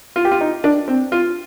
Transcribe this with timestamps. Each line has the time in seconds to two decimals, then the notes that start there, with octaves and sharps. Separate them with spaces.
0.16 F4
0.25 G4
0.31 F4
0.41 D#4
0.64 D4
0.88 C4
1.12 F4